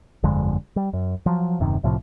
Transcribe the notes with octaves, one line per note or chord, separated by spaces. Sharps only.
G1 F2 D3 G#3
G3
F#2
F3 F#3
D#1 F#2 C3 D#3
C2 A2 C3 F3